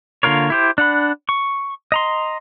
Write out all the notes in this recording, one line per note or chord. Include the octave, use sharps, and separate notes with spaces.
D3 A#3 F4 A#4 C#5
E4 G4 C5
D4 F#5 B5
C#6
D#5 A#5 C6